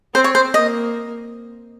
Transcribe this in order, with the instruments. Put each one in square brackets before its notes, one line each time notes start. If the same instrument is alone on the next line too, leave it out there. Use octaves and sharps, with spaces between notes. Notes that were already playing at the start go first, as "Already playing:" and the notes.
[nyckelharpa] C4 [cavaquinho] C5
[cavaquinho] C#5
C5
[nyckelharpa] A#3 [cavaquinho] D#5